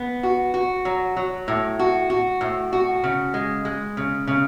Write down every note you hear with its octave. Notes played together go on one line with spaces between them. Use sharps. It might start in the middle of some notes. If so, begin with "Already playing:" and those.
Already playing: B3
F#4
F#4
F#3
F#3
A2
F#4
F#4
A2
F#4
C#3
G#3
G#3
C#3
C#3